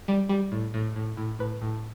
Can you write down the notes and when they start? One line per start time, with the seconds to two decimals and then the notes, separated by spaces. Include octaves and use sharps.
0.08 G3
0.29 G3
0.52 A2
0.74 A2
0.96 A2
1.17 A2
1.39 A2 B4
1.62 A2